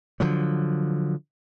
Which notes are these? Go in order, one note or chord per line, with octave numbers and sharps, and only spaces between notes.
D3 F3 F#3